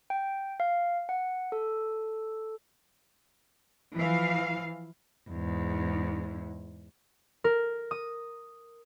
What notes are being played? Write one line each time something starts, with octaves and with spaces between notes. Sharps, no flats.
G5
F5
F#5
A4
E3 F3 F5
E2 G#2
A#4
D#6